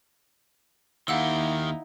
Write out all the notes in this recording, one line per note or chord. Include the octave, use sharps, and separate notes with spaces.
D#2 D#3 D#4 E4 G4 F5 F#5 E6